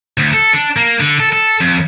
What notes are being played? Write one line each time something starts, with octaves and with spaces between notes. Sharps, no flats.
D2
A4
D4
A#3
D3
A4
A4
F2